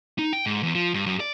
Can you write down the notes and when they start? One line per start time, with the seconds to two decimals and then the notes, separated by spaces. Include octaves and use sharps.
0.19 D#4
0.33 G5
0.46 G#2
0.63 E2
0.75 F3
0.94 G2
1.06 F#2
1.20 D5